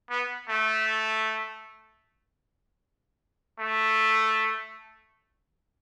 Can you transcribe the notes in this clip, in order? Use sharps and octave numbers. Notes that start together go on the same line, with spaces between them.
B3
A3
A3